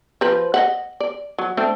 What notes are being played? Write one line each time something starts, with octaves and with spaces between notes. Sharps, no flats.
F3 B4 C5
D#5 E5 F#5
D5
F#3
A3 C4 D4